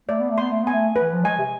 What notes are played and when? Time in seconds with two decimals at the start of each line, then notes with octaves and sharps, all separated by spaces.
0.09 A3 D5
0.20 B3
0.30 A3
0.38 B3 C6
0.51 A3
0.63 B3 G#5
0.73 A3
0.96 B4
1.02 E3
1.13 F3
1.24 G#3 G#5
1.39 C3